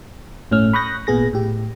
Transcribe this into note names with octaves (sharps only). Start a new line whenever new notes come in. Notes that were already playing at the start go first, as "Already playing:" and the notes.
G1 A2 A3 C#4 F6
B5 C#6 D#6 F#6 G6 A#6
G#1 A#2 B3 G#4 A#6
A2 G4